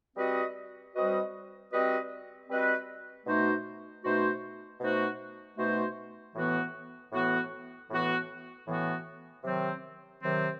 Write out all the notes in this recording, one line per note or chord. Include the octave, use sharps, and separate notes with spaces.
G3 C4 F#4 B4 D#5
G3 C4 F#4 B4 D#5
G3 C4 F#4 B4 D#5
G3 C4 F#4 B4 D#5
B2 A3 D#4 F#4 C5
B2 A3 D#4 F#4 C5
B2 A3 D#4 F#4 C5
B2 A3 D#4 F#4 C5
A2 E3 B3 F#4
A2 E3 B3 F#4
A2 E3 B3 F#4
A2 E3 B3 F#4
C3 D#3 F#3 C4
C3 D#3 F#3 C4